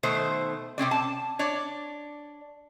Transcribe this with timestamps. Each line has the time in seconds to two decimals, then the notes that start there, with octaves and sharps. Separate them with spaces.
0.03 B2 D#3 A3 C5
0.78 C3 C4 C#4 D5
0.91 A5
1.39 D4 C#5 D5